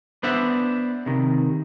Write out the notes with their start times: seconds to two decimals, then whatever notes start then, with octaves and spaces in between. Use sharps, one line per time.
0.23 B3 D4 C5 D5 E5 F#5
1.06 C3 D#3